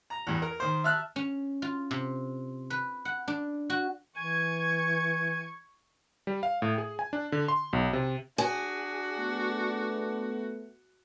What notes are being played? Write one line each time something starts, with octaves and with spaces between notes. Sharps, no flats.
A#5
E2 G2
A#4
D#3 C5
E5 A5 F6 F#6
C#4
F4
C3
B4
F#5
D4
F#4
E3 G#5 C#6 G#6
G3
F5
A2
G#4
G#5
D4
D3
C6
B1
C3
D4 F#4 G#4
A3 B3